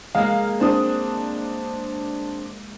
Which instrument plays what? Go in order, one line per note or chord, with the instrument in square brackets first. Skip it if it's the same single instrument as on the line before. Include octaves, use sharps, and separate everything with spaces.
[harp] G#3 A#3 [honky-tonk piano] F5
[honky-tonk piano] C4 D4 D#6